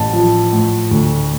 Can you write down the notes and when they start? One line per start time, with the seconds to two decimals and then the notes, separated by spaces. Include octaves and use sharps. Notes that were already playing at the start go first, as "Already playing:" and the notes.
Already playing: A1 A5
0.13 F3
0.53 A2
0.91 D2